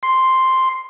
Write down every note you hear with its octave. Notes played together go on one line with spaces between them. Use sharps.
C6